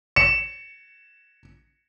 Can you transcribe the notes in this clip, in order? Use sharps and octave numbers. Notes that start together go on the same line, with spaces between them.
C#7 E7